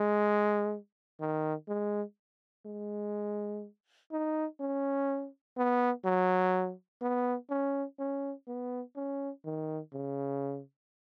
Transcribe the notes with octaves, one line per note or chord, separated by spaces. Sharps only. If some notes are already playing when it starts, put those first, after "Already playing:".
Already playing: G#3
D#3
G#3
G#3
D#4
C#4
B3
F#3
B3
C#4
C#4
B3
C#4
D#3
C#3